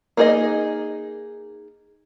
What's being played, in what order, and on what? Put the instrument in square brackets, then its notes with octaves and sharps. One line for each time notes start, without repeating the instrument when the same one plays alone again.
[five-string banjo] A#3 D#4 G#4 D5 D#5